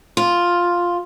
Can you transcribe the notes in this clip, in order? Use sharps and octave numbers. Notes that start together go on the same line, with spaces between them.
F4